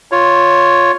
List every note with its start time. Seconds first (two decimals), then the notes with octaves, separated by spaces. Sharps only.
0.12 F4 C#5